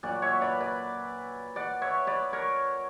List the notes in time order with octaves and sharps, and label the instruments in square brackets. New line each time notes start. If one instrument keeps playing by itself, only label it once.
[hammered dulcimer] A#2 F#3 D5 F#5
C#5 E5
B4 D5
B4 D5
D5 F#5
C#5 E5
B4 D5
A#4 C#5